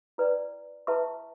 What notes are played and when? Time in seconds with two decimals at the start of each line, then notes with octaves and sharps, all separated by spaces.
0.18 E4 B4 D5 G5
0.87 E4 B4 E5 A5 C#6